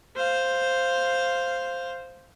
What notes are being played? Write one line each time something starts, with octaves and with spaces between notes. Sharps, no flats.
C5 F5